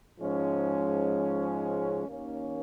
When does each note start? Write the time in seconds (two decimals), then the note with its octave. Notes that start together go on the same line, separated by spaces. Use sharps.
0.20 G#2 F3 G#3 C#4
2.05 D#2 D#3 A#3 C#4